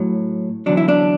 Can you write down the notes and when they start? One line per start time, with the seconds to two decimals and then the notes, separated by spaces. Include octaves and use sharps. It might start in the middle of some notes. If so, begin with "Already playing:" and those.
Already playing: A2 F#3
0.66 E2 D3 F#3 D4
0.77 E4
0.88 D4